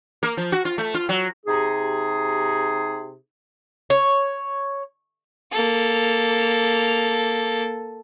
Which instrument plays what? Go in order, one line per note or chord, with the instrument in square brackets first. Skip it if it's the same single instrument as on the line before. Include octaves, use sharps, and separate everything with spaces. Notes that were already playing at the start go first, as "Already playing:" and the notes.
[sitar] A#3
F3
F#4
F4
A3
F4
F#3
[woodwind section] C3 D#4 G4 G#4
[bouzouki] C#5
[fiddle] A#3 A4